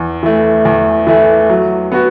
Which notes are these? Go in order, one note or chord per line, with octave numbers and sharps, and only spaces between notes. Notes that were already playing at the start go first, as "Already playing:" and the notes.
Already playing: E2
E3 A3
E2
E3 A3
F#3
B3 F#4